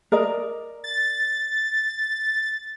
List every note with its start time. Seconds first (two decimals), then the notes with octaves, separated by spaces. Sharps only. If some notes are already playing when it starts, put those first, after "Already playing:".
0.12 A#4 D5 D#5
0.84 A6